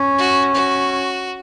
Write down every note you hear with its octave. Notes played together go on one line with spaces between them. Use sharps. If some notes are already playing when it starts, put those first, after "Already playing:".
Already playing: C#4
F#4
F#4